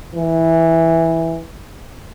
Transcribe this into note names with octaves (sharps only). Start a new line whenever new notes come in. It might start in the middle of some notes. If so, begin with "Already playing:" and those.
E3